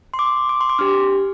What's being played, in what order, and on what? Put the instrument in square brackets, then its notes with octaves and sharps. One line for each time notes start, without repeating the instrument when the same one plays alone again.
[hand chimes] C6
D6
D6
C6
D6
D4 G4 F6